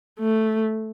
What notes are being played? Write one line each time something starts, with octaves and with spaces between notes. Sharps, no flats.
A3